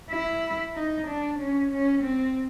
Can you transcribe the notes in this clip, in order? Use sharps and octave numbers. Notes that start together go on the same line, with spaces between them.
E4
D#4
D4
C#4
C#4
C4